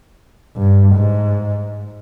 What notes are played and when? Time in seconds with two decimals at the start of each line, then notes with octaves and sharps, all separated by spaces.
0.57 G2
0.96 G#2